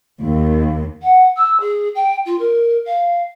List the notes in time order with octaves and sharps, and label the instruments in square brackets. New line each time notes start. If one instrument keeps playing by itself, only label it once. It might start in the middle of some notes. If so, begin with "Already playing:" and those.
[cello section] D#2
[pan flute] F#5
E6
G#4
G5
F4
A#4
F5